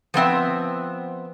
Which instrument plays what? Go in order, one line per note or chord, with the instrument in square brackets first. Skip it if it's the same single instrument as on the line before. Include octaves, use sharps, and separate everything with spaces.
[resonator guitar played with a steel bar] F3 B3 C4 E5